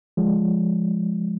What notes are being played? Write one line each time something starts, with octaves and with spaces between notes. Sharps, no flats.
F3 G#3